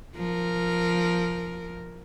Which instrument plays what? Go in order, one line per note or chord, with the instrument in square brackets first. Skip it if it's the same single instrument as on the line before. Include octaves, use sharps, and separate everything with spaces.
[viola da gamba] F3 A#4